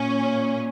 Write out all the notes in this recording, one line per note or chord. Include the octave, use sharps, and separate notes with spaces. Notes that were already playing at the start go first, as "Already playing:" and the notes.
Already playing: A#2 C#4